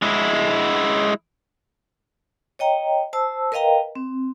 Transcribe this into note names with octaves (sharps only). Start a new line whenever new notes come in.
G#3 E4
C#5 D#5 G5 A#5
C5 A5 E6
A#4 B4 D#5 F5 G5 A#5
C4